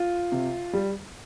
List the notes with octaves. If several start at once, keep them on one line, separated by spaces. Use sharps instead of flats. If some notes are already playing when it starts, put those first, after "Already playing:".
Already playing: F4
C3
G3